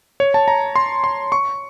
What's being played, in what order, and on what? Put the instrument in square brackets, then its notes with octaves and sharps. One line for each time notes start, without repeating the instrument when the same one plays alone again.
[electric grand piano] C#5
A5
A#5
C6
C6
C#6